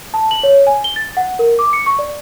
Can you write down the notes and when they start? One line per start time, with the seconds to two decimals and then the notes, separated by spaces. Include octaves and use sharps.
0.14 A5
0.31 F#7
0.43 C#5
0.67 G#5
0.84 G7
0.96 A6
1.17 F#5
1.39 A#4
1.59 D6
1.73 C#7
1.86 C#6
1.99 D5